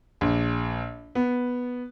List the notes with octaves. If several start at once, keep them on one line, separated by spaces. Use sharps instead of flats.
A#1
B3